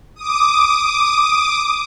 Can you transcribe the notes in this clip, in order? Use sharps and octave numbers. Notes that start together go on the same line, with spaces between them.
D6 D#6